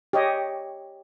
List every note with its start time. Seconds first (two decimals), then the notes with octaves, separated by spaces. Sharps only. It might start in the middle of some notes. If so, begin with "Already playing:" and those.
0.13 G4 C#5 D#5